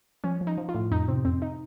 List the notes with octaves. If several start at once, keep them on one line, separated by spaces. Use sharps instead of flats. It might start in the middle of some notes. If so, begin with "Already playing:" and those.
F3 C#4
F3
D#4
F3
F4
A2
F2 D#4
C3 C4
F2 C4
D#4